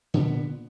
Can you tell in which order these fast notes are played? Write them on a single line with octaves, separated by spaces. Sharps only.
D3 A#2 B3